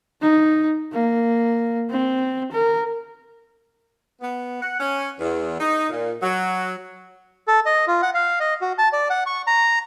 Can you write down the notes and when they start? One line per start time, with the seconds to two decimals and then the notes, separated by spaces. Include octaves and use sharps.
0.21 D#4
0.93 A#3
1.91 C4
2.53 A#4
4.21 B3
4.62 F#5
4.80 C#4
5.20 E2
5.60 D#4
5.89 A#2
6.22 F#3
7.48 A4
7.66 D#5
7.87 F4
8.02 F#5
8.14 F5
8.40 D#5
8.61 F#4
8.78 A5
8.93 D5
9.10 F#5
9.26 C#6
9.47 A#5